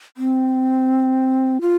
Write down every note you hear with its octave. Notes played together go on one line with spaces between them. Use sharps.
C4
F4